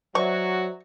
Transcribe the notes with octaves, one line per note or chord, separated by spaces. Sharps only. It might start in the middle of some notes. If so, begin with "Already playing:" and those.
F#3 F#4 C5 D5 E5 C#6